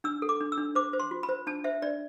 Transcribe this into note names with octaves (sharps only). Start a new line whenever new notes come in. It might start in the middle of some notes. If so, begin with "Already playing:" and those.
D4 E6
A4
D6
D4
E6
D4
C5 D6
C5
C6
F4
B5
C5
D4 A5
C5 E5
D4 D5